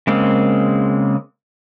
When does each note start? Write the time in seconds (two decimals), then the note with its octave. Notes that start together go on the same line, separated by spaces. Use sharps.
0.07 C#3 G#3 A#3 C4